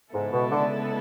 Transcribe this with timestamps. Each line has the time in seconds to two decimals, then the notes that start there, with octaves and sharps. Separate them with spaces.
0.14 G#2 C#3 G#3 B3 E4 A4
0.33 B2
0.51 D3